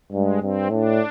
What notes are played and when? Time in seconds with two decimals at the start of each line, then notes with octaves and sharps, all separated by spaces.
0.13 G2 G#3
0.42 G2 C4
0.70 A2 D4